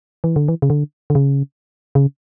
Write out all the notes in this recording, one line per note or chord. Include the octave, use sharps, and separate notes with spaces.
E3
D3
E3
C#3
D3
D3
C#3
C#3